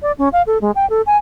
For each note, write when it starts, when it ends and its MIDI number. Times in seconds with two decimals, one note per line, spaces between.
0.02 0.12 74
0.18 0.29 61
0.33 0.42 77
0.47 0.58 69
0.61 0.71 56
0.75 0.88 79
0.90 1.02 69
1.07 1.17 80